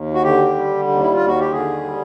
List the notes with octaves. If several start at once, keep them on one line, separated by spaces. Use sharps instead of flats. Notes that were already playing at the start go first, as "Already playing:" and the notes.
Already playing: D#2
F#4
D3 G4
G3
D#2
E4
F4
D#2
F#4
G4
D3 G#4
G3